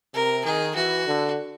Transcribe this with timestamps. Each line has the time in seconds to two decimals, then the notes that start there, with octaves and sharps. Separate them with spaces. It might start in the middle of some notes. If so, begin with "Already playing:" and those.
0.13 C3 A#4
0.44 D#3 G#4
0.75 E3 F#4
1.06 D3